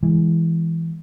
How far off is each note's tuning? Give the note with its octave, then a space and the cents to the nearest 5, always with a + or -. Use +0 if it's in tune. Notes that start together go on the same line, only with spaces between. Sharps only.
E3 +0 G#3 +0